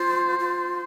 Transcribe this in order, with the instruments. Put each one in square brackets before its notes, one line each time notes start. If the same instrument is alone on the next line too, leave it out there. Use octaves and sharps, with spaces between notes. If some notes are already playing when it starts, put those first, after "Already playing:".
Already playing: [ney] F4 [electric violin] C5
[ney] F4